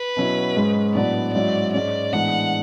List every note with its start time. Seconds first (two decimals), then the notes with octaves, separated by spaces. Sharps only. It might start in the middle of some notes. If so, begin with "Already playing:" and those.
Already playing: B4
0.17 B2 F#3 C#4 E4
0.56 G#2 G#3 C#4
0.94 A2 F#3 B3 D4 D5
1.33 G#2 F#3 C#4 E4 D5
1.73 G#2 G#3 C#4 D5
2.12 A2 E3 G#3 B3 D4 F#5